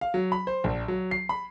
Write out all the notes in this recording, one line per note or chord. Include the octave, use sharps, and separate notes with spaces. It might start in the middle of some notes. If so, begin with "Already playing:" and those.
F5
F#3
B5
C5
A#1
F#3
C7
B5